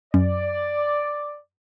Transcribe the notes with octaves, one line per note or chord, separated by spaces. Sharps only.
F#2 D5